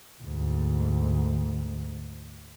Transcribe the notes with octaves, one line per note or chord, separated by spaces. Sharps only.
D2 G#2